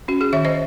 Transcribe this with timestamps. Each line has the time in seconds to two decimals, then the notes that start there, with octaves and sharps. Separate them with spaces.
0.08 C#4 F#4
0.21 G#4
0.33 D#3 C#5 E5
0.45 C5 D#5